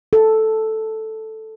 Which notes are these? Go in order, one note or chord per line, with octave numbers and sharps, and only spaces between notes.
A4